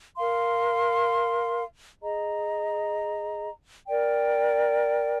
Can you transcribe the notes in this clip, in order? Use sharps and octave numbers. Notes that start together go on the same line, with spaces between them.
A#4 F5 C6
G#4 D#5 A#5
A#4 D5 G5